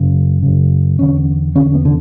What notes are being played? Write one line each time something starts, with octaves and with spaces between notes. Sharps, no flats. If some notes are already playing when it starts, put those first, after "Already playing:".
Already playing: F#2 C#3
F#2 C#3
E2 D3 C#4
E2 D3 C#4
B3
D3